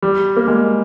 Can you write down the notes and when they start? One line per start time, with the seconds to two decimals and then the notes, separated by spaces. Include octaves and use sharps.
0.03 G3
0.37 A#3
0.48 G#3